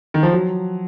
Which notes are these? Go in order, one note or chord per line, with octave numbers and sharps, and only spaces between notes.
D#3
F3
F#3